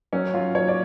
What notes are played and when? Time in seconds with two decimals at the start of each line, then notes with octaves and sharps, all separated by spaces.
0.13 F#3 C#4
0.34 F#3 F4
0.55 F#3 C#5
0.68 D5